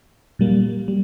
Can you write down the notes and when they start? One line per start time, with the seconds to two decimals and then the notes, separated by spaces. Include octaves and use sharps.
0.39 A#2 G3 A#3
0.88 G3